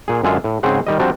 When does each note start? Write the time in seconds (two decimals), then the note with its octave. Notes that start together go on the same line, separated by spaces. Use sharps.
0.08 A#2 G#4
0.24 F#2 D3 G#3 F4 G#4 E5
0.44 A2
0.63 G#2 C#3 C4 G#4 C5 F#5
0.87 D#3 G3 D#5
1.00 F3 G3 C4 D4 F#4